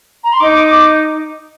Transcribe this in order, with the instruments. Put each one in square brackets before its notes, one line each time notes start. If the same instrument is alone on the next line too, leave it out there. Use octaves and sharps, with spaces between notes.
[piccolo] A#5
C6
[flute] D#4 [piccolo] D6
[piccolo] D6